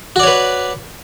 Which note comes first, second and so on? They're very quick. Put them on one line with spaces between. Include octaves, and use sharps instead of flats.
F#4 D5 C#5 B4